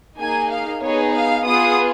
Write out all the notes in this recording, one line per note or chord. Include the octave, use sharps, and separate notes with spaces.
A#3 D#4 G#4 G#5
F5
B3 D#4 G#4 C#5
F5
B3 F4 G#4 D#6